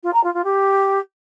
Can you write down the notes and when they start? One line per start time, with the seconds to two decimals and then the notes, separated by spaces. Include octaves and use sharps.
0.03 F4
0.14 A#5
0.24 F4
0.34 F4
0.44 G4